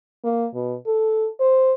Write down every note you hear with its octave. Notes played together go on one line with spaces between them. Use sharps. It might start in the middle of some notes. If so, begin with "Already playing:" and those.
A#3
B2
A4
C5